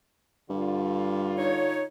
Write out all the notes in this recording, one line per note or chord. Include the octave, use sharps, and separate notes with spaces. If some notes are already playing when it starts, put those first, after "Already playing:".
G2 D3 F4
D#4 C#5